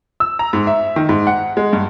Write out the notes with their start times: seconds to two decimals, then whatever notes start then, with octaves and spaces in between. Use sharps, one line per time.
0.20 E6
0.39 A#5
0.53 G#2
0.67 E5
0.96 D#3
1.09 G#2
1.27 F#5
1.57 G#3
1.73 G2